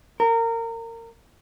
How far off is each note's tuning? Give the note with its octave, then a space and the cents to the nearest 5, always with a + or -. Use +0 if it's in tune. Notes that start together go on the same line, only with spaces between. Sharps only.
A#4 -25